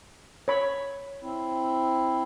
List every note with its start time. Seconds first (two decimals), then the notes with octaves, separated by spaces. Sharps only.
0.48 C#5 B5
1.22 C4 E4